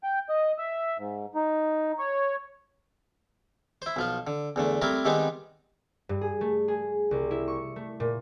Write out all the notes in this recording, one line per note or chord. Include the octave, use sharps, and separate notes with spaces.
G5
D#5
E5
G#2
D#4
C#5
E4 C5
B1 F3 F4
D3
E2 D3 A3
G3 A3 C4 E4 A#4
D#3 G3 G#3 B3 C4 D#4
G2
G#4
A3
G#4
C2
E4
C#6
A3
A#2